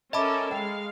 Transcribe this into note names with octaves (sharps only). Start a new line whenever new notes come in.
C#4 A4 A#4 D#5 E5 A5 B5 D6
G#3 F5 G5